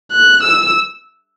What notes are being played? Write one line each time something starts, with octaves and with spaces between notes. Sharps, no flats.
F#6
E6